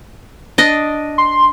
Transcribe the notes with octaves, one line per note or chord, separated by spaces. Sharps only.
D4 D#5
C6